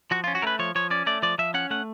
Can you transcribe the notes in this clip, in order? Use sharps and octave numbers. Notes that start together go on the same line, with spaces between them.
F3 F#4
F4
C#4
F#4
A3 A#4 B4
F3 C#5
F3 C#5
C#4 D5
A3 D5
F3 D5
F3 E5
C#4 F#5
A3 F#5